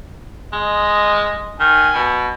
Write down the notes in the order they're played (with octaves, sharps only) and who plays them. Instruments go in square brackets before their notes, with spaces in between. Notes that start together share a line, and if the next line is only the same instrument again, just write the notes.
[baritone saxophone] G#3 [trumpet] D#5
[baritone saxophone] D#3 [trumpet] G#5
[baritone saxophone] B2